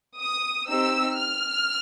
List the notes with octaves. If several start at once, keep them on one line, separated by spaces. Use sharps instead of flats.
D#6
C4 D#4 G4 E6
F6